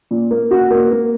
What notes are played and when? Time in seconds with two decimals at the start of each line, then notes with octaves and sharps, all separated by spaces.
0.11 A#2
0.31 A#3
0.51 F#4
0.71 A#3
0.91 A#3